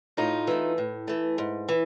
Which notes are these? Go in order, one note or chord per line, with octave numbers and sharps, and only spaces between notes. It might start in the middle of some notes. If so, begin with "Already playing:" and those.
A2 D#4 F4
E3 A3
A2
E3 A3
G#2
E3